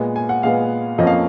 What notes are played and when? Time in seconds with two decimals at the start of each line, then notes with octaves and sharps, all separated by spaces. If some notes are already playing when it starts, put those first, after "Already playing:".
Already playing: A#2 G#3 B3
0.16 G#5
0.29 F#5
0.43 A#2 G#3 B3 F5
0.98 F2 F3 A#3 C#4 D#5
1.07 F5